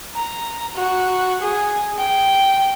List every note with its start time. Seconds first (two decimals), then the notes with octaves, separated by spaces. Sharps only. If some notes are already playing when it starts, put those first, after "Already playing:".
0.15 A#5
0.75 F#4
1.41 G#4
1.98 G5